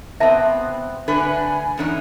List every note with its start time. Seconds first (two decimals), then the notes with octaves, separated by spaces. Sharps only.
0.20 C3 B3 C4 E5 A5
1.08 D3 A3 B4 G#5
1.78 E2 D3 C#4 D#4